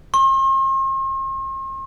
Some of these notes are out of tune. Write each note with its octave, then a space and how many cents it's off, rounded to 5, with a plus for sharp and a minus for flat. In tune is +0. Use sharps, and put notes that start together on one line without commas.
C6 +45